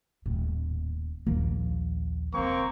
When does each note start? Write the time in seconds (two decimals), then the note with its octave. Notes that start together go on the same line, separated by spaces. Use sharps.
0.26 D#1 A2
1.26 A#1 D#2 F3 A#3
2.34 E1 C#3 A#3 C4 C#6